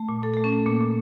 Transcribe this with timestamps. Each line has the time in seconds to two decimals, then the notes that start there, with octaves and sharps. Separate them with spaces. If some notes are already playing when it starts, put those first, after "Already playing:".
Already playing: A3
0.09 A#2
0.23 A#2 A4
0.33 A4
0.37 A3
0.44 C#4
0.52 A3
0.66 A#2 A#3
0.81 A#2